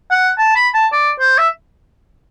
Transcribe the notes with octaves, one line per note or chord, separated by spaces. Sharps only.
F#5
A5
B5
A5
D5
C5
E5